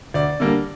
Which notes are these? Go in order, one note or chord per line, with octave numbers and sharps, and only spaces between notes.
D2 D5
D3 G3 A#3